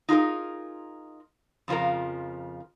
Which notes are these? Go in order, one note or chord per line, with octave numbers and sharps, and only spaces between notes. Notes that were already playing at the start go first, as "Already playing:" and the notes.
D#4 F4 G#4 A#4
F2 C#3 F3 F4 A#4